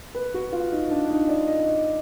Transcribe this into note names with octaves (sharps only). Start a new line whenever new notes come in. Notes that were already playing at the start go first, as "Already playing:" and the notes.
B4
F#4
F4
D#4
D4
D#4
D5
D#5